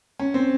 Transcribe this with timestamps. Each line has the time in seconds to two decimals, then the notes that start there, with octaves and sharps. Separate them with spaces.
0.20 C#4
0.34 C4